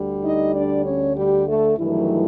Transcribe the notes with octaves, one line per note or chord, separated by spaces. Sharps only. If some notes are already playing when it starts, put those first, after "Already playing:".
Already playing: D2 D3 G3
D#4 D#5
D4 D5
C#4 C#5
G3 G4
A3 A4
G2 D#3 E3 F#3 A3 E4